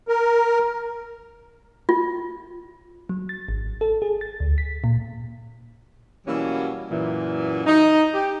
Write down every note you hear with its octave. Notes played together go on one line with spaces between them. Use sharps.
A#4
F4
F#3
A6
G#1
A4
G#4
A6
D2
B6
A#2
B2 E3 F#3 G3 A#3 C#4
F#2 A#2 E3
D#4
G4